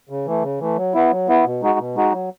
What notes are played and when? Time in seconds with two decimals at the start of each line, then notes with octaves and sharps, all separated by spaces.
0.09 C#3
0.26 E3 A3
0.43 C#3
0.60 E3 A3
0.76 F#3
0.94 B3 E4
1.11 F#3
1.28 B3 E4
1.45 B2
1.62 G#3 D#4 F#4
1.79 B2
1.96 G#3 D#4 F#4
2.13 F#3